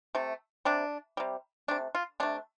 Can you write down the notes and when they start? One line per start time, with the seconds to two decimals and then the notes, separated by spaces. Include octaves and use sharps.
0.15 C3 A3
0.65 C3 G3 D4
1.17 C3 G3
1.68 C3 A3 D4
1.95 F4
2.20 C3 A3 D4